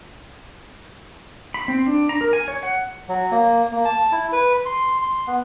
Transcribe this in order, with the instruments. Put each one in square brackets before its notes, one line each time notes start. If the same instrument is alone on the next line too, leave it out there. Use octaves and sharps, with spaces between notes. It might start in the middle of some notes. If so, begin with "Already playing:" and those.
[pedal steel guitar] B5
C4
D4
A#5
A#4
G#5
C#5
F#5
[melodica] F#3
A#3
A#3
A5
E4
B4
C6
C6
B3